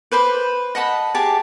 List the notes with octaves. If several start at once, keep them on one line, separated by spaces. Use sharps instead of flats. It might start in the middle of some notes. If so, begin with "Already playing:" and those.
B4 C5 B5 D6
D#5 F#5 A5 B5
G4 G#4 A5